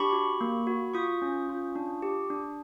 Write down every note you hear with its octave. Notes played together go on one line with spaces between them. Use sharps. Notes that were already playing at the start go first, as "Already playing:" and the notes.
Already playing: D4 G4 B5 C#6
F#4
A#3
F#4
F4 C#6 D#6
C#4
F4
D4
G4
D4